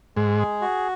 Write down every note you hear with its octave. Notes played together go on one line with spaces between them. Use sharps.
G#2 G#3
G#4
F#4